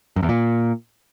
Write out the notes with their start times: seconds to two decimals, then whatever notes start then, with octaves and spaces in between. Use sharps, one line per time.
0.16 F#2
0.23 E2
0.29 A#2